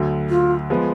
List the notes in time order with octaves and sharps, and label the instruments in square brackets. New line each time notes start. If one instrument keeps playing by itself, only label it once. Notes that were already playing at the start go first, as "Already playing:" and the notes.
Already playing: [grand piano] D2 D3 F#3
[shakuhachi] F4
[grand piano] F3 G#3 B3